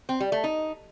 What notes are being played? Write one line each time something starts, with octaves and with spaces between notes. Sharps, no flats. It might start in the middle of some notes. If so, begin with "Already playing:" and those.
C4
G3
A3
D#4